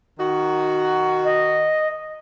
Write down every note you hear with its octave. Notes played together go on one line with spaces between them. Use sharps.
D#3 D#4 F#4
D#5